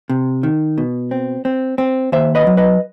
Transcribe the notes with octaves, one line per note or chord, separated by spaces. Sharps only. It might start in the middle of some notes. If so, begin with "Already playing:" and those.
C3
D#3
B2
C4
C4
C4
D#2 C5 E5
B4 D#5
F#3
B4 D#5